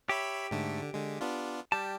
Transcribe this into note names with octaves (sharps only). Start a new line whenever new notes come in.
G4 C#5 E5 B5
G#2 D3 A3
D3
D3 G#3
B3 D4 F4
G3 G4 A5